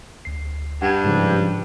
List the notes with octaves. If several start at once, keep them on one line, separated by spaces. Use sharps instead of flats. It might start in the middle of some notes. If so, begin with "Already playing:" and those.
D2 C7
G2 F#5
G#2 C#3 F3